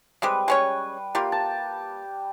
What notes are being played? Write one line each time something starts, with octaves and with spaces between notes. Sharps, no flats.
G3 G#3 C4 G4 B4
G#3 C#4 C#5
G3 A#3 F4 G4
A5